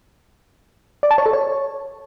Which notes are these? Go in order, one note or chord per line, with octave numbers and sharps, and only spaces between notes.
D5
A5
C#5
A4
C#5